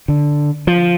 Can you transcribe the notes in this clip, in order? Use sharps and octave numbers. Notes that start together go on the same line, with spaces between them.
D3
F3